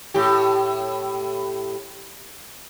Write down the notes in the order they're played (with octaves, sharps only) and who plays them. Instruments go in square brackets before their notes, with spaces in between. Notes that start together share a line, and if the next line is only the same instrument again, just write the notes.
[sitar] A2 G4